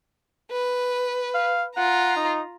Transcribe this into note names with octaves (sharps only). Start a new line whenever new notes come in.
B4
F5
F4 F#5 A#5
D#4